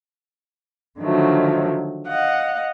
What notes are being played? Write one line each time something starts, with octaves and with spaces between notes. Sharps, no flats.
D3 D#3 F3 F#3 A3
D#5 F5 F#5